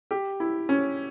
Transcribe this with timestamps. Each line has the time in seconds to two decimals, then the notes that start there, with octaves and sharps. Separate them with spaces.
0.11 G4
0.40 E4
0.69 C#4